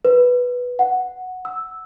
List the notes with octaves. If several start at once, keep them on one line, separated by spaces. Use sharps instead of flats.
B4
F#5
E6